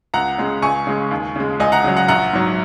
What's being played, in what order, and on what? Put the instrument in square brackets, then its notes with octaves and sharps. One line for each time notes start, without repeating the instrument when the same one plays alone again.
[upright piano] C#2 F#5 A#5
C#3 G#3
C#2 G#5 C#6
C#3 G#3
D#2
C#3 G#3
C#2 D#5 G#5
F#5 A#5
C#3 F#3
F#5 A#5
A#1 F#5 A#5
G#2 F#3